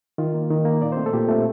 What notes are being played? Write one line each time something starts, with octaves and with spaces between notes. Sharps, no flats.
D#3 F4
A#3
D#3
A#3
A#2 D5
C5
A3 C4
A4
A#2 G4
A3 C4 F4